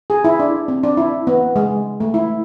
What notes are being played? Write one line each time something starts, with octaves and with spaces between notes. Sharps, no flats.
G#4
E4
D4
C4
D4
E4
B3
G#3
A3
E4